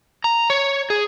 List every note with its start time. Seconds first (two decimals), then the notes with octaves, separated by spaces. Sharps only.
0.24 A#5
0.50 C#5
0.90 G#4